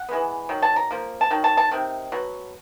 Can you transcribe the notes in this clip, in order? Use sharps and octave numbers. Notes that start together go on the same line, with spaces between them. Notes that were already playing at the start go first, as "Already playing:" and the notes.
Already playing: F#5
E3 G#3 B3
D#3 F#3
A5
A#5
F3 A#3
A5
D#3 F#3
A5
A5
C3 D#3
B2 F#3